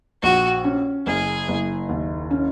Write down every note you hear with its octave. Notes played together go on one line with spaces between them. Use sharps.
A#1 F#4
C#4
F#1 G#4
F#1
D#2
C#4